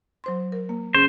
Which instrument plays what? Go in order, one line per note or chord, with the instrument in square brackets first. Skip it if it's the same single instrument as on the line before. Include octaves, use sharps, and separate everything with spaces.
[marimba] F#3 C5 C6
A#4
A#3
[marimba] C#3 C#4 G#4 [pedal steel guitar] C5